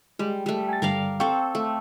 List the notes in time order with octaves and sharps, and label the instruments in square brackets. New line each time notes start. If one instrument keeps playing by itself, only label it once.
[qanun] G3 [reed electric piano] G#3
[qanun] G3 A3
[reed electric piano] G#5 A6
[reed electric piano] G2 D3 G3 [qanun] A#4 D5 F5
[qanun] C4 A4 [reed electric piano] F5 G5 C#6
[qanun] A3